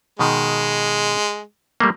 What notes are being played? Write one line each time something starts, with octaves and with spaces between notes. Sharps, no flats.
B2 D#3 G#3
G3 A3 A#3